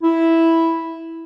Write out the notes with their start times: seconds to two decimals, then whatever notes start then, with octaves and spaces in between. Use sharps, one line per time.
0.01 E4